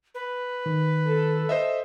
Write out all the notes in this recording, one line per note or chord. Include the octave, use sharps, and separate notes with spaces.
B4
D#3
A4
C5 D#5 E5